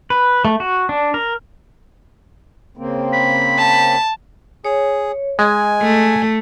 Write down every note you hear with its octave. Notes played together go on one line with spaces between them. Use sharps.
B4
A3
F#4
D4
A#4
C#3 A#3 C4
B5
A5
G#4 C#5
G#3 D#5 G#5
A3